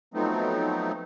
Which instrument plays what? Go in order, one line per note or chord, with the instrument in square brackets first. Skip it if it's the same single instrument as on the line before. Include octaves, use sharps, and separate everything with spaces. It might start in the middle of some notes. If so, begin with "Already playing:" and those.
[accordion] F3 F#3 A3 B3 C4 D#4